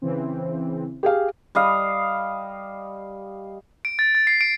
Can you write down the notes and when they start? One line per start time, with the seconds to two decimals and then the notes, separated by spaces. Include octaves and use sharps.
0.02 C#3 E3 C4
1.03 G4 G#4 F5
1.55 G3 D#5 F5
3.85 D7
3.99 A6
4.15 A6
4.27 C7
4.41 D7